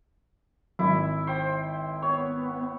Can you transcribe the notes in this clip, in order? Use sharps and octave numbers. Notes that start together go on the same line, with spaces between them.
G#1 E4
C5 G5
B3 C#5